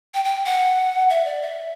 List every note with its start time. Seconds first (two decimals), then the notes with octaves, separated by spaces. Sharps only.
0.14 G5
0.25 G5
0.46 F#5
1.10 E5
1.25 D5
1.42 E5